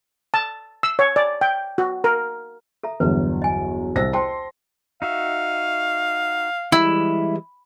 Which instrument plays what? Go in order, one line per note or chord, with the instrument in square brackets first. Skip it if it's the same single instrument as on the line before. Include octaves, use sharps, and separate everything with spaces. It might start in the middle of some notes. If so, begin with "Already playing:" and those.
[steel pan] A5
E6
C#5
D5
G5
F#4
A#4
[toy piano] A4 E5 A#5
[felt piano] G1 E2 F#3 [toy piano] B4
[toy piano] D#5 G#5
[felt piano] C2 A#6 [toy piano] C5 D#5 E6
[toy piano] C5 G5 A5 [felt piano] C6
[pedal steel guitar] D#4 F#4 E5 [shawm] F5
[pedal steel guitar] E3 G3 G#3 [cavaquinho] E4